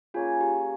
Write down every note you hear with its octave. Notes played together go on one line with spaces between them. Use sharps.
A#3 C#4 F4 G#4
G4